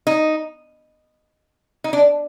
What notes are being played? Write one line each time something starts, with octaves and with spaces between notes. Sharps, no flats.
D#4
D#4
D4